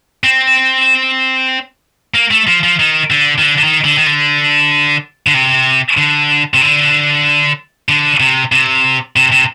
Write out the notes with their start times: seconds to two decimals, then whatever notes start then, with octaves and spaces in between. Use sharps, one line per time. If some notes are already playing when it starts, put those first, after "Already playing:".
0.24 C4
2.14 A#3
2.31 A3
2.47 F3
2.63 F3
2.79 D#3
3.10 D3
3.38 D#3
3.42 D3
3.58 D3
3.64 D#3
3.84 D3
3.98 D#3
4.06 D3
5.27 D3
5.34 C3
5.97 D3
6.54 C3
6.61 D3
7.89 D3
8.20 C3
8.52 C3
9.16 C3
9.32 C3